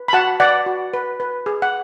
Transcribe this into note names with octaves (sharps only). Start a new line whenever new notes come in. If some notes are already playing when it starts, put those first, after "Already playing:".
Already playing: B4
B5
F#4 F#5 A5
B4 D5 F#5
F#4
B4
B4
G#4
F#5